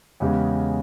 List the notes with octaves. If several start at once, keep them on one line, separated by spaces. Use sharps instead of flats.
E2 C#3 G#3 C#4 G4